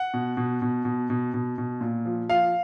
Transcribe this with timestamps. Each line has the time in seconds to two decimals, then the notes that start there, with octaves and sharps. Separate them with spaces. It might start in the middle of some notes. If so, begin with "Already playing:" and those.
Already playing: F#5
0.14 B2
0.37 B2
0.62 B2
0.85 B2
1.10 B2
1.34 B2
1.58 B2
1.81 A#2
2.06 F3
2.29 F3 F5